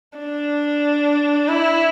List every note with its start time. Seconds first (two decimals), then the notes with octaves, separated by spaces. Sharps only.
0.18 D4
1.48 E4